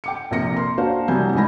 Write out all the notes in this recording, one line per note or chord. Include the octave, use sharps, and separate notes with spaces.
G5 D6 C#7
A#1 C3 A#4 A#6 C#7
A#4 C6
A#3 D4 F#4 C5 F5
C2 F#3 G3 G#5 G6
A1 G#2 D#3 G#5 B5 A#6